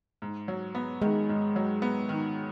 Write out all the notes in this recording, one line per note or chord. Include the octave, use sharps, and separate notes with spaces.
G#2
F#3
B3
D#3 G#3
G#2
F#3
B3
D#3